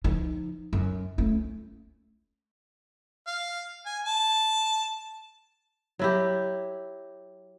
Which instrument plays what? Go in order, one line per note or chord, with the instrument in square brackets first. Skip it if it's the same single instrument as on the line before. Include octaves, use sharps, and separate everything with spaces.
[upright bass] F3 D#4
F#2
A3 C#4
[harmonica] F5
G#5
A5
[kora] F#3 E4 G4